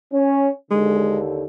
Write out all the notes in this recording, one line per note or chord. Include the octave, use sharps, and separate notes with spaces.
C#4
D#2 D3 G#3